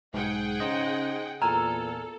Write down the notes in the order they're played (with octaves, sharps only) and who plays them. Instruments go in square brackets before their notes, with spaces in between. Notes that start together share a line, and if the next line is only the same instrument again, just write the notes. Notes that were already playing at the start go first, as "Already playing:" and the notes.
[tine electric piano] B1 G#2 [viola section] G#4 F#5 G5
[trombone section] C#3 [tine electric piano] D#4 C5 D#5
[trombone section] E2 A#2 [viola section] A4 [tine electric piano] G#5 E6 F6 [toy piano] A#5